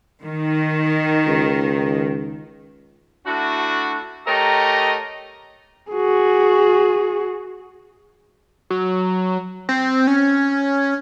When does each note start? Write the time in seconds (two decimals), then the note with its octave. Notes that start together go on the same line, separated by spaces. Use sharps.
0.23 D#3
1.27 C#2
3.26 A3 D4 E4 F#4
4.26 A3 G4 A#4 C#5 D#5 A#5
5.92 F#4 G#4
8.70 F#3
9.69 C4
10.07 C#4